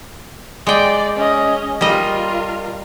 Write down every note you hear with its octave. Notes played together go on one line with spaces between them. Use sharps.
G#3 D5 G5
C#4 D#5
G3 F4 A#4 D#5